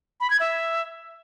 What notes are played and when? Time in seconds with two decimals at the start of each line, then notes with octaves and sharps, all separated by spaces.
0.20 B5
0.30 G#6
0.40 E5